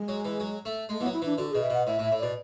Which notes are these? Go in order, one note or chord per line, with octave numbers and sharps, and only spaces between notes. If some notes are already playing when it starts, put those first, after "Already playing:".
Already playing: G#3
F#3
E3
F#3
A3
G#3 A3
E3 B3
F#3
E4
E3 D4
D3 F#4
G#4
B2
E5
B2 F#5
A2 E5
A2
E5
A2
B2 D5